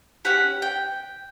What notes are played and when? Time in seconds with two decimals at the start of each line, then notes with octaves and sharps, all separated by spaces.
0.25 C#4 G4 F#5
0.62 G5